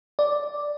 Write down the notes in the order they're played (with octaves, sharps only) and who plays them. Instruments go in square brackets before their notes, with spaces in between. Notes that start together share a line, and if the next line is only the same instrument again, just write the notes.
[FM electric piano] D5